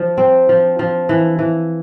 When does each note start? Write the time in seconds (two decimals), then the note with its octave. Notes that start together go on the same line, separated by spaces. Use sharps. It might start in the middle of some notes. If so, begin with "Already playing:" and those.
Already playing: F3
0.18 C4
0.49 F3
0.79 F3
1.09 E3
1.39 E3